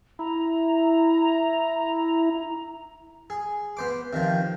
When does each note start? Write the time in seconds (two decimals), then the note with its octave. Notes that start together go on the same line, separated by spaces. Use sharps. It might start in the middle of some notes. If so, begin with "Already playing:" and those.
0.19 E4 A#5
3.30 G#4
3.77 B3 C5 D6
4.13 C3 D#3 F3